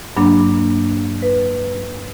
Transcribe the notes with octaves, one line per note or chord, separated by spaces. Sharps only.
G2 F#3 A#3 D4
B4